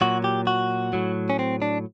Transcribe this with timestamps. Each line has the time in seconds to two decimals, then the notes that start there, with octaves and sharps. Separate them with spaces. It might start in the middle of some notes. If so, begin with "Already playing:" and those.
0.01 A#2 F#3 F#4
0.24 G4
0.47 F#4
0.93 A2 F#3
1.30 C#4
1.39 C4
1.62 D4